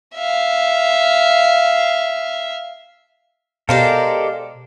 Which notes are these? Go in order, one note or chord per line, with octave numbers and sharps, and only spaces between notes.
E5 F5
B2 G#3 G4 A4 A#4 C5 D5 F5